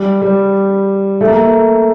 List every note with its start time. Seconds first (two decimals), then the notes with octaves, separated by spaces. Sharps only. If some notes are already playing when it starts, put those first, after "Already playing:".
Already playing: G3
0.21 G3
1.21 A3
1.28 A#3
1.36 A3